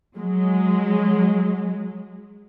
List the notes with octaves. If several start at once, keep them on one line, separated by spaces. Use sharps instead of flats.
F#3 G#3